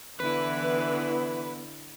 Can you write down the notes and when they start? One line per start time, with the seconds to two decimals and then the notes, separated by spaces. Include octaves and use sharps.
0.20 D3 E3 B3 E4 B4